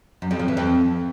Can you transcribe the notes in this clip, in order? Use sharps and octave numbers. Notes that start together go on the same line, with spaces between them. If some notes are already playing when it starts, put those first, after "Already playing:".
F#2
F2
F3
E3
F2